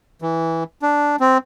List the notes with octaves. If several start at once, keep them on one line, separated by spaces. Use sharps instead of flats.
E3
D4
C4